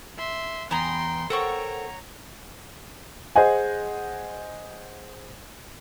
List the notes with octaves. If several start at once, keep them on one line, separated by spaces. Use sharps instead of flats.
E5 C6
E2 B3 G5 G#5 A#5 C6
A4 A#4 C5 C#5 F#5 G5 A#5 C#6
G#4 C5 D#5 F#5 G#5